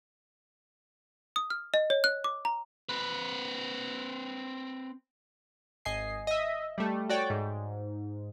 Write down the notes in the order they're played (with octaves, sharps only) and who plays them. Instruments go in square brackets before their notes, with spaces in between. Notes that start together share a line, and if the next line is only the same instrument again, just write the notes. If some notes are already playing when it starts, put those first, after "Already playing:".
[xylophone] D#6
F6
D#5
C#5
F#6
D6
A#5
[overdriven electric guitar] C4 B4
[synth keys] G#1 D#5 G#5 C7
D#5 E5
G3 A3
F#4 C#5 D5 G5
G#2